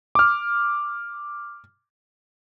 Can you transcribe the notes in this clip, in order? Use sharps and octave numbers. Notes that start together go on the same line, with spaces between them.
D6 F6